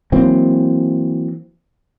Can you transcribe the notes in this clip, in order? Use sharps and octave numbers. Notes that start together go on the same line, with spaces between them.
E3 F#3 A#3 C4